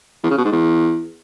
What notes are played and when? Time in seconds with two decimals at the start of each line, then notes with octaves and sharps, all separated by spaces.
0.23 E2
0.30 C#3
0.38 B2
0.45 G#2
0.52 E2